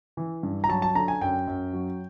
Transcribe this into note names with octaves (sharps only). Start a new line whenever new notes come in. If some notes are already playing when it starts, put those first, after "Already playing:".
E3
G2
A#5
F#3 A5
A5
D3 A#5
G#5
F#2 G5
F#2
F#3